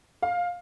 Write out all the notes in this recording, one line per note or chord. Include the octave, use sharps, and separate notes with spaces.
F5